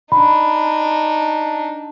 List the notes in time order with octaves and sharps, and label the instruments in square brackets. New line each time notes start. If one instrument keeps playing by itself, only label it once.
[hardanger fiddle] D4 D#4 [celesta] B5